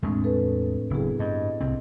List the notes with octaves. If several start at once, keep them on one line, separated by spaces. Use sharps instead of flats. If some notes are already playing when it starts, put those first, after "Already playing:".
E2 A2 G#3 A3 C4 D4
A4 B4
F#1 B3 E4 G#4
G2 D#5
C2 C4